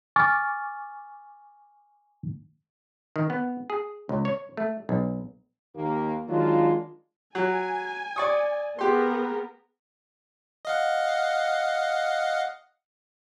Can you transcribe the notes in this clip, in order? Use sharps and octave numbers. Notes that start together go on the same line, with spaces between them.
G#5 C#6 D6 F6 A6
D#3
B3
G#4
C#2
C#5
A3
B1
D#2 A#3
D#3 F#3 G#3 D4 F4
F#3 G#5
D5 C#6 D#6
B3 G4 G#4 A#4 C6
D#5 F5 F#5